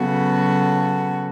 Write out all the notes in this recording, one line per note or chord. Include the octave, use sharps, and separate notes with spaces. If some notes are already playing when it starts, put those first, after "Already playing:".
Already playing: C#3 F#3 B3 F#4 A4